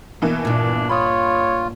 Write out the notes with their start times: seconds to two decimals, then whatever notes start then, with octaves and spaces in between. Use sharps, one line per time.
0.22 B2 E3 A#3
0.45 G2 A#2 D4
0.89 F4 C#5 B5 D#6